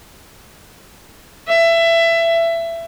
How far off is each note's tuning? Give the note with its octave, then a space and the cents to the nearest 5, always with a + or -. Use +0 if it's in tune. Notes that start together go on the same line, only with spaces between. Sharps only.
E5 +20